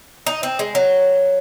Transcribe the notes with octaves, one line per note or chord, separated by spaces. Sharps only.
D#4
C4
G#3
F#3